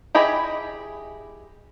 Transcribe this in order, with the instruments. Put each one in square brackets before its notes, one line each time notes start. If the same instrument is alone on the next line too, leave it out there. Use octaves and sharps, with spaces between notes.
[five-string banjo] E4 G4 G#4 D#5 B5